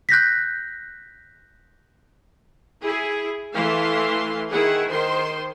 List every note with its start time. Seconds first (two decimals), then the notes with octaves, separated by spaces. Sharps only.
0.09 F#6 G6 A#6 B6
2.83 E4 G#4
3.54 E3 A3 F5 C6
4.51 D#3 E4 G#4 F#5
4.90 D#3 C5 C6